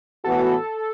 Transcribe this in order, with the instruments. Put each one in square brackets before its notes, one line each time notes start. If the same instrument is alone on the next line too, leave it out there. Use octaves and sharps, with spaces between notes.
[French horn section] A2 E3 B3 F#4 [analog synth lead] A4